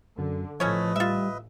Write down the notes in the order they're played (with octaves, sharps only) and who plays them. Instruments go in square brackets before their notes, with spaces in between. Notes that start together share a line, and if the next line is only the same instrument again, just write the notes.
[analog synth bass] F#2 [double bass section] D3
[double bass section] A1 [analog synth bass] F3 [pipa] A3 C#4 C#5 [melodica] B4 D#5
[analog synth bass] G3 [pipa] F4 E5